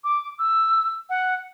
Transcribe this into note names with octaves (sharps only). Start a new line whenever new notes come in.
D6
E6
F#5